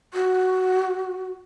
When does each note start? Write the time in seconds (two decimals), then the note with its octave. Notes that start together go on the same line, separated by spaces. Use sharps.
0.14 F#4